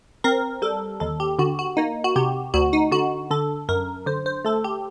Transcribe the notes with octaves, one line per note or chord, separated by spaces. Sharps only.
C4 A#4
G3 A4
D#2 A4
G4
D3 F#4
F#4
A#3 D#4
F#4
C3 G4
D2 F#4
D#4
D3 F#4
D3 A4
F#2 A#4
D3 C5
C5
A3 A4
G4